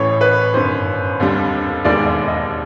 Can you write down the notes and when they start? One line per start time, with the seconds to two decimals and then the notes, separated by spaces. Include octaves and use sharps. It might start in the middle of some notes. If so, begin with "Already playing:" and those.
Already playing: A1 A2 E3 C#5
0.21 B4
0.54 G1 F#2 D#3 C5
1.20 F1 D#2 D3 G3
1.85 E1 D#2 D#3 G#3 D5
2.06 D5
2.28 D#5